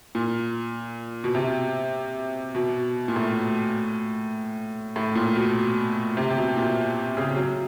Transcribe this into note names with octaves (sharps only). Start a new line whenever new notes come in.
A#2
B2
C3
B2
A#2
A2
A2
A#2
B2
C3
C3
B2
A#2
C#3
F#3